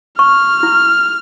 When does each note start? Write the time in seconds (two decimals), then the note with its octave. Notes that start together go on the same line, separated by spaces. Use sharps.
0.19 C#6 F6
0.63 E4